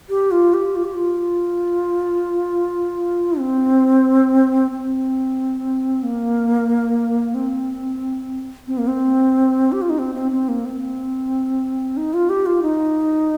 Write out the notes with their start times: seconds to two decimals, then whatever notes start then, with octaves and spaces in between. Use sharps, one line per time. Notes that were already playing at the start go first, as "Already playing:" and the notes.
0.10 G4
0.31 F4
0.54 G4
0.76 F4
0.84 G4
0.94 F4
3.39 C4
4.71 C4
6.03 A#3
7.34 C4
8.67 C4
8.78 A#3
8.87 C4
9.72 G4
9.82 F4
9.90 D#4
9.99 C4
10.15 C4
10.32 C4
10.49 A#3
10.65 C4
11.97 D#4
12.14 F4
12.29 G4
12.46 F4
12.62 D#4